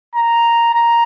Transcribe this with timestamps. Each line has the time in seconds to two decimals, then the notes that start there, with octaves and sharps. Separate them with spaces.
0.15 A#5
0.74 A#5